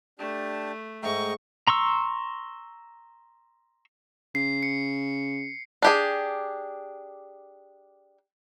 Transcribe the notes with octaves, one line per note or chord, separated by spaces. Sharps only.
A3 D4 G4 A5
G#2 A3 D#5 G5 A#5 C#6
A#5 C6 C#6 E6
C#3 C7
C#7
D4 G4 G#4